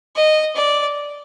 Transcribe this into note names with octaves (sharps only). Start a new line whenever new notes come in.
D#5
D5